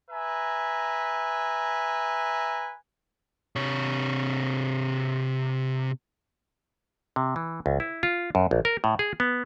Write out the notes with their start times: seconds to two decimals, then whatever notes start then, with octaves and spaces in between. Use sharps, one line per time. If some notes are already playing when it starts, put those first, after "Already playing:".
0.10 B4 E5 G#5 A#5
3.56 C3 C#5
7.16 C3
7.36 E3
7.66 C#2
7.80 E4
8.03 F4
8.35 F#2
8.51 A#1
8.65 A#4
8.84 A2
8.99 G#4
9.20 B3